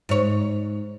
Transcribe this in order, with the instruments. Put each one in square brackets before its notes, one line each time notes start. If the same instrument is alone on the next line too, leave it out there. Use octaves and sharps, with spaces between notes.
[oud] G#2 C#5